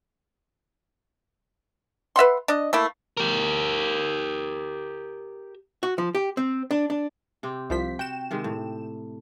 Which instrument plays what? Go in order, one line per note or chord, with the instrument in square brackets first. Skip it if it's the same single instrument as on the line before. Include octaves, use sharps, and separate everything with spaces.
[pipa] B4 E5 F#5 C6
D4 D#5
A3 A#3 E4
[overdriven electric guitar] G4 A#4
[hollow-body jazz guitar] F#4
F3
G4
C4
D4
D4
[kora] C3 C4 G4
[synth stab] C2 F3 B6 [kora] C5
[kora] F#4 [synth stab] G5 E7
[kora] C3 D#3 G#3
A2